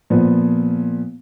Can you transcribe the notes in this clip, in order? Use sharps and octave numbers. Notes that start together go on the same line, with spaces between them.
A#2 F3 B3